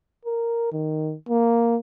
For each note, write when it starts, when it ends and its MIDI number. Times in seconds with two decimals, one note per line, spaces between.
0.25 0.70 70
0.72 1.14 51
1.29 1.77 58